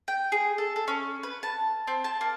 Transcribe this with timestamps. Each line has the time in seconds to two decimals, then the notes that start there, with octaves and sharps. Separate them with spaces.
0.08 G5
0.32 G#4
0.58 A4
0.76 A4
0.88 C#4
1.23 B4
1.43 A5
1.87 C4
2.04 A5
2.21 A#3